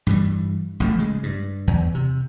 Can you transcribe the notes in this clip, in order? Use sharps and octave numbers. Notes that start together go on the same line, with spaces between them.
G2 E3 G3
A1 F3 A3
C#3 G#3
G2
E2
C3